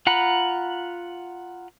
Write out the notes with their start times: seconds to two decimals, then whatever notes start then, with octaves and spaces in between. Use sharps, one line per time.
0.07 F4 F#5 A#5 B5